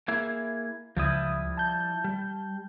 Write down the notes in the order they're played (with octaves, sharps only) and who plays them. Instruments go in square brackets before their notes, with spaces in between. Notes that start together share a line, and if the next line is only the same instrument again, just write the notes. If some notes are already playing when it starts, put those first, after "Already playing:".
[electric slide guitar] A#3 E4 G#4
[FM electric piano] C#2 D#6 [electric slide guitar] F3 G3 E4
[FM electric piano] A5 G6
[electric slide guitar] G3